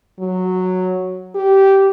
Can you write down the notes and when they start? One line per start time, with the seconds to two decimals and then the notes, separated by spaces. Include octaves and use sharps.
0.20 F#3
1.35 G4